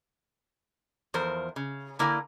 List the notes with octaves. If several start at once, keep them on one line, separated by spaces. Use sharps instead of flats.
E2 F3 A#4 C5
C#3
D3 A#3 E4 A#4 F5 G#5